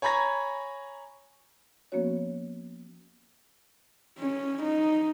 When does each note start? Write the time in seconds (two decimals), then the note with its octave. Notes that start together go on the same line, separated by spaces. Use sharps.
0.02 C#5 G#5 A#5 B5 G#6 A#6
1.92 F3 A#3 B3 C#4 F#4 C#5
4.19 C#4
4.63 D#4